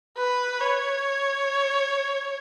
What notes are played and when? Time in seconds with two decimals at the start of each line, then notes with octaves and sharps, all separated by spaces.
0.18 B4
0.60 C#5